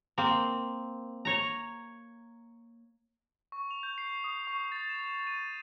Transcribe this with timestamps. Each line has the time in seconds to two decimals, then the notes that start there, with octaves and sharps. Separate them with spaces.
0.18 A#3 C4
1.25 C#5 A#5
3.52 C#6
3.71 F7
3.83 G6
3.98 C7
4.24 D#6
4.47 C#6
4.72 A6
4.89 E7
5.27 D#7